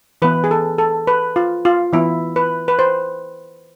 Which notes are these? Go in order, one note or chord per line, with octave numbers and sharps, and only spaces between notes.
E3 B3 B4
G#4
A4
A4
B4
F4
F4
E3 B3 E4
B4
B4
C5